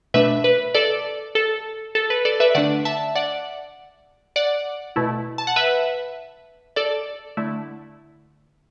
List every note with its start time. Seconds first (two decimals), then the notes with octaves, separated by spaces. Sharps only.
0.14 B2 A3 D4 B4 E5
0.44 B4
0.75 A4 D5
1.35 A4
1.95 A4
2.10 B4
2.25 A4 D5
2.40 B4 E5
2.55 D3 A3 D4 D5 F#5
2.85 E5 A5
3.15 D5 F#5
4.36 D5 F#5
4.96 B2 A3 E4
5.38 A5
5.47 F#5
5.56 B4 E5
6.76 A4 D5
7.37 D3 A3 E4